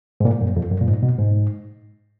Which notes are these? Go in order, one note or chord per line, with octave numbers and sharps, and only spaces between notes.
G#2
A#2
F#2
F2
F#2
A#2
G#2
B2
G#2